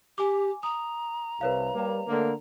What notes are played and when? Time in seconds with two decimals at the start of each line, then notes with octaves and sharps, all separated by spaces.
0.18 G4 G#5 D6
0.63 A#5 D#6
1.41 C2 B4 C#5 F5
1.75 G3 A#3
2.08 D3 A3 A#3